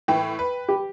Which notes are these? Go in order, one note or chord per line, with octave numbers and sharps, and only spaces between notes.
A2 E3 G5
B4
G4